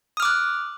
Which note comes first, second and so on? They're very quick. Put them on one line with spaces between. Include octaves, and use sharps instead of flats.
D#6 F6 D6 F#6